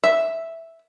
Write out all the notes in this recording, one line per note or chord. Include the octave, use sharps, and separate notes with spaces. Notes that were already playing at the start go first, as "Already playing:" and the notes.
E5